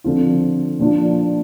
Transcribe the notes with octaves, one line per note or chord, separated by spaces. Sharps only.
D3 F3 C4 F4
A#2 F3 D4 F4